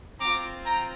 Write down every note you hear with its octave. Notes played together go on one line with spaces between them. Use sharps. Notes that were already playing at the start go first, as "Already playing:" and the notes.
C4 F4 A#5 D6
G5 A#5